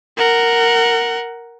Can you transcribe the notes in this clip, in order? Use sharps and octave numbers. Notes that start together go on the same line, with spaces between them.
A#4 F#5